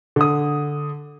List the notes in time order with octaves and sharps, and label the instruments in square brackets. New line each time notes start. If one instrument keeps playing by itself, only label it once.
[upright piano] D3 D#6